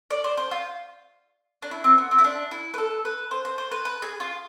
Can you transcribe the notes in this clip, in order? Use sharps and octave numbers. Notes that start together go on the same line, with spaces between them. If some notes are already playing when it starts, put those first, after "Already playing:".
D5
C5
C5
F4
D4
E4
C4
B3
C4
E4
D4
E4
B4
A4
B4
C5
C5
C5
B4
B4
G#4
F4